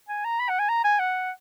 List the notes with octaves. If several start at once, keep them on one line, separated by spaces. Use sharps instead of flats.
G#5
A#5
B5
F#5
G#5
A#5
G#5
F#5